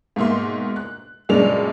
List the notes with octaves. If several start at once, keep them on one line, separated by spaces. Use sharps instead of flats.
G#2 B2 A#3 E5 C6
F#6
F#1 F#2 A#2 G#3 D4 F7